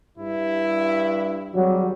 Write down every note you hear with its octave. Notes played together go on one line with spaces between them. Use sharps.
G2 E4
G#1 F#3 G3